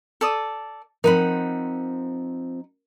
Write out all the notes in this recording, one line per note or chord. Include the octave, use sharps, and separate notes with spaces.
A4 D5 D#6
F3 C4 D#4 A#4 F#5 B5